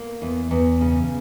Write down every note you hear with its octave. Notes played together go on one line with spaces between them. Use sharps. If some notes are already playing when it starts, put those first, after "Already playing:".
Already playing: A#3
E2
E2
C#3